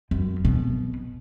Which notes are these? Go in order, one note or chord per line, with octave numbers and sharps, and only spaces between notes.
F#2
B2